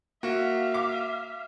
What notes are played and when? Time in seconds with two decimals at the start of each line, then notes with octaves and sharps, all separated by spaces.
0.23 A#3 F#4 E5 F5
0.74 D6